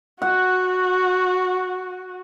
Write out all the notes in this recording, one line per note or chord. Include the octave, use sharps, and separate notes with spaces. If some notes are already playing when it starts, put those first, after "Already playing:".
F#4 F#5